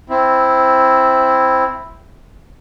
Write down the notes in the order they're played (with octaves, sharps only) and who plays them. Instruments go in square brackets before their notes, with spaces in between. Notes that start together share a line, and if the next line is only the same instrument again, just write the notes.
[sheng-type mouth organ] C4 E4